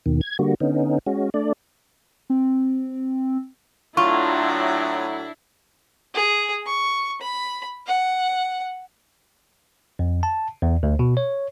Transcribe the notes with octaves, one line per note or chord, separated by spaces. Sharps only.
D#2 B2 D#3
G#6
D3 G3 A#3 F#4
D3 B3 C#4 D#4
G#3 C#4 F#4
A3 D4 D5
C4
A2 F#3 D4 E4 F4 C#6
G#4
C#6
B5
F#5
F2
A5
E2
D2
B2
C#5